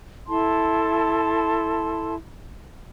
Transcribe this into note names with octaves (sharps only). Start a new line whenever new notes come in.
E4 A4 A5 C6